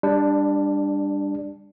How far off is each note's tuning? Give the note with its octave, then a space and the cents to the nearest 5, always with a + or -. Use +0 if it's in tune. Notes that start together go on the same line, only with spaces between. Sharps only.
G3 +25 D4 +0